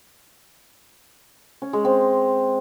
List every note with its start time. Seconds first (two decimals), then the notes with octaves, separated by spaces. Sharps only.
1.62 C#4
1.73 G#3
1.85 C4